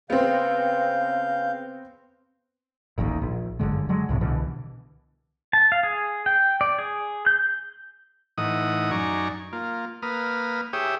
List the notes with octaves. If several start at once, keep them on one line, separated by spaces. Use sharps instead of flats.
C#3 B3 C4 F5 G6
D#1 A1 D#2 D#3
A#1
G1 F#2 D3 G#3
D3 F#3 G#3
C2 A2 C3
C2 B2 D3 E3
A5
F5
G#4
G5
D5
G#4
G6
A2 E3 D#4 D#5 F#5 D#6
F#2 D#4 D5 G#5 A#5 C#6
A#3 F4
A#3 B4 D#6 F6
G4 G#4 C#5 E5 G5 D#6